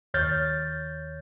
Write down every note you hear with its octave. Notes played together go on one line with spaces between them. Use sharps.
D#2 C#5 F6 G6 A6